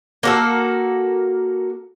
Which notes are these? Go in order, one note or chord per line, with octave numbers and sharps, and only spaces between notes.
A#3 F#4 A4